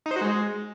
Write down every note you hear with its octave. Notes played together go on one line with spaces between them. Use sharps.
D#4
C5
F#4
G#3